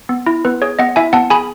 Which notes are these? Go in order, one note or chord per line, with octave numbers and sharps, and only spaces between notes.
B3
E4
B3 B4
G#4 C#5
B3 D#5 F#5
E4 E5 G#5
B3 F#5 A5
G#4 G#5 B5